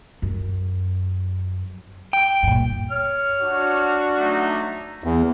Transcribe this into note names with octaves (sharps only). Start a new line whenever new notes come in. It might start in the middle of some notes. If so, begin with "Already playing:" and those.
F#2
G5
G2 A#2
C#5 F6
D4 F#4
F#3 A3 D#4
E2